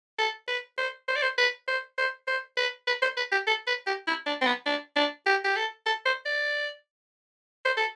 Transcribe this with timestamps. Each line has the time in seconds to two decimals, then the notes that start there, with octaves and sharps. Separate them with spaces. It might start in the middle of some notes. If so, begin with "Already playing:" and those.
0.19 A4
0.48 B4
0.78 C5
1.08 C5
1.15 D5
1.22 C5
1.38 B4
1.68 C5
1.98 C5
2.27 C5
2.57 B4
2.87 B4
3.02 C5
3.17 B4
3.32 G4
3.47 A4
3.67 B4
3.87 G4
4.07 E4
4.26 D4
4.41 C4
4.46 B3
4.66 D4
4.96 D4
5.26 G4
5.45 G4
5.56 A4
5.86 A4
6.05 C5
6.26 D5
7.65 C5
7.77 A4